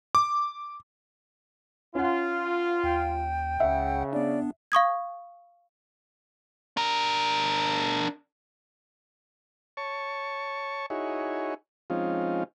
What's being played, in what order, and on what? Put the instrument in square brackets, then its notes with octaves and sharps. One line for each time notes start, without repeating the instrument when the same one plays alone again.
[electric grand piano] D6
[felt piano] C#4 F#5 [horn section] F4
[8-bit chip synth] D#2 [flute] G5
[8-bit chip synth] C#2 F#5 [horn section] C#3 [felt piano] E5
[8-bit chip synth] B3 D4 [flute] D5
[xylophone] F5 C#6 D#6 G#6
[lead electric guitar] D4 A#4
[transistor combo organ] C#5 A5 C#6
D#4 E4 F#4 G#4 C#5
F3 G#3 C4 C#4 D#4 F4